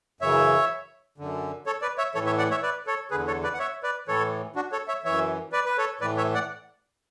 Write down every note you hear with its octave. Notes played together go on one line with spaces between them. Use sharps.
F#2 C#3 E3 C#5 E5
F#2 D3
A4 C#5
B4 D5
C#5 E5
A2 E3 A4 C#5
C#5 E5
D5 F#5
C#5 E5
B4 D5
A4 C#5
E2 D3 G#4 B4
A4 C#5
B4 D5
F#5
C#5 E5
B4 D5
A2 E3 A4 C#5
D4 F#4
A4 C#5
C#5 E5
F#2 E3 C#5 E5
B4 D5
B4
A4 C#5
A2 E3 B4 D5
C#5 E5
D5 F#5